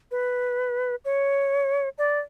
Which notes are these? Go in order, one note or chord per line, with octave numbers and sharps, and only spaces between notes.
B4
C#5
D5